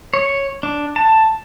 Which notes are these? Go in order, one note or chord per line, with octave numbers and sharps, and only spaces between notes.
C#5
D4
A5